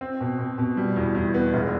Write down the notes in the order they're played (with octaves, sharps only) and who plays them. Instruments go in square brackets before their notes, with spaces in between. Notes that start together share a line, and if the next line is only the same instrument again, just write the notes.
[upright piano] C4
B2
B2
B2
G3
E2
E2
B3
E1